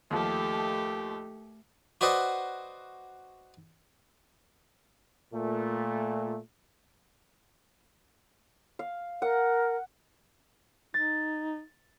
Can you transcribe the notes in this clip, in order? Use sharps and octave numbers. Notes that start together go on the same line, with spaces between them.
D#2 F3 A3 G4
F#4 B4 C5 D5 D#5 F#5
A#2 A3
F5
A#4 F#5
D#4 A6